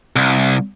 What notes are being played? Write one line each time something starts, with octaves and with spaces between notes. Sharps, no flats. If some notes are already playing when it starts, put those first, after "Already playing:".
C2